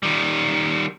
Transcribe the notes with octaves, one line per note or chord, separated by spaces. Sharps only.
D#3 G3